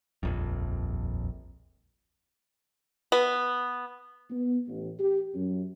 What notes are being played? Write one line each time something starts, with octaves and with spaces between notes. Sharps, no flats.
D#1 A#1 F2
B3
B3
A1
G4
F#2